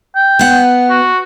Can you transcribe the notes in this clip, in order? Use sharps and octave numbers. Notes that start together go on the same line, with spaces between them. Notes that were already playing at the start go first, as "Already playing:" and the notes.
G5
B3 F#5
F#4